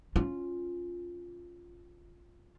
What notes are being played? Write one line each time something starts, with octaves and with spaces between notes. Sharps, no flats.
C#4 F4